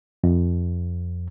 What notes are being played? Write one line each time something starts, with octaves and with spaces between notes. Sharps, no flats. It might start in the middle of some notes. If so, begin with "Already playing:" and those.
F2